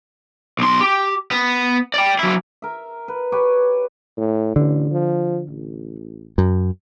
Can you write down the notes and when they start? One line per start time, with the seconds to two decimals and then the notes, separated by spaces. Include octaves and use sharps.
0.59 B1 C6
0.81 G4
1.31 B3
1.94 D5 G5
2.19 F#3 E4
2.62 A#4 E5
3.08 B4
3.32 G4 B4 C#5
4.17 A2
4.56 A1 D3
4.91 F3
5.49 A1
6.38 F#2